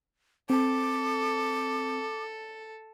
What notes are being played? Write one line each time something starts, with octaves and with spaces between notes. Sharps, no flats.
C4 A4 D6